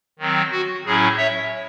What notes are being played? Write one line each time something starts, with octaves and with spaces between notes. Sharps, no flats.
D#3 F#3 C4
F#4
A2 F#3 C#4 E4 G#4
C#5 E5